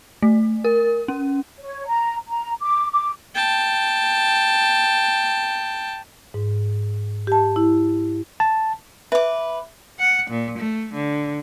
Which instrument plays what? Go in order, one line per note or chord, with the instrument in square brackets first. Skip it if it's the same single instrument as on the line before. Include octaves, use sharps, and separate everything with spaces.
[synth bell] A3
A#4
C#4
[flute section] C#5
A#5
A#5
D6
D6
[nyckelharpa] G5 A5
[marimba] G#2
G4 A5
E4
[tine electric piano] A5
[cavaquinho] B4 D6 [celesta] E5
[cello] F#5
A#2
A3
D3